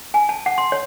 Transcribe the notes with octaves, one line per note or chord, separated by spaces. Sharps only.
G#5
A5
F#5
C6
C#5